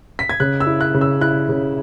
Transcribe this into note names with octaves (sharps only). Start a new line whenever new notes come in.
B6
G#6
C#3 F#6
E6
E4
F#6
C#3
E6
E4 F#6
C#3